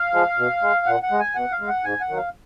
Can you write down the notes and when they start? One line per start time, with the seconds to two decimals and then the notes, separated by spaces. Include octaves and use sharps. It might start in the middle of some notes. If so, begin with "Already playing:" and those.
Already playing: F5
0.13 F3 G#3
0.38 B2
0.62 G#3
0.86 A#2 F#5
1.03 F#5
1.11 G#3
1.19 G#5
1.35 B2 F#5
1.52 F5
1.60 G#3
1.68 F#5
1.84 G#2 G#5
2.01 F#5
2.09 D#3 F#3
2.17 F5